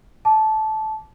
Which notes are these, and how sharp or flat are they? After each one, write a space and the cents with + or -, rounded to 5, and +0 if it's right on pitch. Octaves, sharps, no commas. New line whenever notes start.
A5 -15 D6 -10